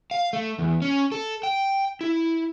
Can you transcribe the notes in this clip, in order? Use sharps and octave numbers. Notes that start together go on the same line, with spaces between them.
F5
A3
E2
C#4
A4
G5
E4